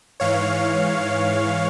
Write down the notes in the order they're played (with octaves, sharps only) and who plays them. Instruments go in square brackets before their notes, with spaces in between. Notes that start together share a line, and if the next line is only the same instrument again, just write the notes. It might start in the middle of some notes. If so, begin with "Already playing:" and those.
[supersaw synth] G#2 E3 C#5 F5